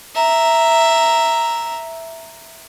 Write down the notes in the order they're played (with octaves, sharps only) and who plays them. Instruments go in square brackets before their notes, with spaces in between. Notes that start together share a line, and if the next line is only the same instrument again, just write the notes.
[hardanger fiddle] E5 A#5